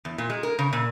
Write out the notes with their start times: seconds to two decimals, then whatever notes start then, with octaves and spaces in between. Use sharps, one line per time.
0.05 E2
0.18 A#2
0.30 G#3
0.43 A#4
0.59 C#3
0.73 A#2